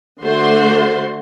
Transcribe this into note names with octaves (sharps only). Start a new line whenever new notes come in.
D3 A3 F#4 C5 C6